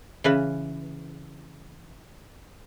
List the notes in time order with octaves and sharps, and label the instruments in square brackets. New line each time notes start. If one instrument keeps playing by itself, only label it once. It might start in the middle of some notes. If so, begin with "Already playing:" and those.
[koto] C#3 E3 B4